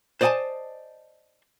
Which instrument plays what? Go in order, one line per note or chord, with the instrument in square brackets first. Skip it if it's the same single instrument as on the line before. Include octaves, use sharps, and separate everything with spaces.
[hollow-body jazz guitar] C5 D5 D#5 F5 G#5 A5